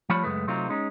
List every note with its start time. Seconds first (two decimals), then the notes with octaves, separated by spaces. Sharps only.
0.09 F3 G3 A3 F4 C#5 B5
0.24 C#2 F#2 G#3 A3 B4
0.48 C3 F#3 A3 C4 D#4 F4
0.70 G#3 C#4 D#4